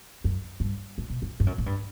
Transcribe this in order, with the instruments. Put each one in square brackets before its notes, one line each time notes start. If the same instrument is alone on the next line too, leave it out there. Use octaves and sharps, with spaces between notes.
[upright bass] F#2
G2
A2
B2
F#2
G2
F#2
A2
G2